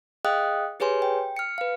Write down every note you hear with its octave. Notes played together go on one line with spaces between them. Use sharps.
G#4 D#5 F5 G5 D#6 F#6
G4 G#4 B4 C#5 G#5 C6
G5
F6 C#7
B4 F5